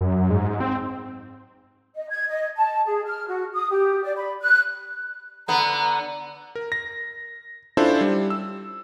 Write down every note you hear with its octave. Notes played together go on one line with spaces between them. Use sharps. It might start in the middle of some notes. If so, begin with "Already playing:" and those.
F#2
G#2
C4
D#5
G#6
D#5
A5
G#4
F6
F#4
D#6
G4
D5
B5
F#6
D3 B3 A#5
A#4
A#6
C#4 D4 E4 F4 A4 C5
G3
E6